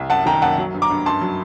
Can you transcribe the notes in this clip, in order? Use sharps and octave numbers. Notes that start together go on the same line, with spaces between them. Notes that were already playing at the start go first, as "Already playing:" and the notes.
Already playing: C2
F#2 F#5 A5
D#3 G5 A#5
F#2 F#5 A5
F#3
G2
A#5 D6
G2
F#2 A5 C6
F#3